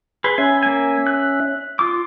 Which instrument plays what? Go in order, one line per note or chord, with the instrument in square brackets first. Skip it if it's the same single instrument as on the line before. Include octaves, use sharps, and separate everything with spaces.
[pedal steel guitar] G#4 B4 [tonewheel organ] C6
[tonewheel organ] C#4 E5 [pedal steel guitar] G#5
[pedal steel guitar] A#3 G#5
F#6
F4 D6